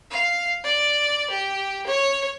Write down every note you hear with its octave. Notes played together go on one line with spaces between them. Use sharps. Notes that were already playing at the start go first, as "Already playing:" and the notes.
F5
D5
G4
C#5